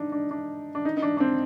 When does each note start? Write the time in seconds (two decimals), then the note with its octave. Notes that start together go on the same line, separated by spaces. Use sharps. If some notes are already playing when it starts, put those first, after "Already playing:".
Already playing: D4 D#4
0.12 D4
0.31 D4
0.75 D4
0.85 D#4
0.97 D#4
1.02 D4
1.17 D4
1.20 C4